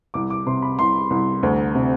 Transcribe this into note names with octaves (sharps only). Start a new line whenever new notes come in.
C2 D6
D6
C3 C6
B5
C2 C6
C2
D2
C3